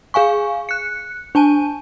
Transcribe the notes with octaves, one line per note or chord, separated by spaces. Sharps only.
G#4 F5 G#5 C#6
F#6 C#7
D4 G#5 A5 D#7